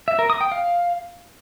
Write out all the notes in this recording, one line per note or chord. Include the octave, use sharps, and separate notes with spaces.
E5
A#4
D#6
G5
F5